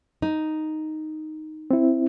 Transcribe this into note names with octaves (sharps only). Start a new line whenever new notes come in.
D#4
C4 E4